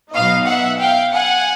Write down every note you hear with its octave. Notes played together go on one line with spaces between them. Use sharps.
B2 F#3 B3 D#4 D#5 F5
E5 F#5
F5 G5
F#5 G#5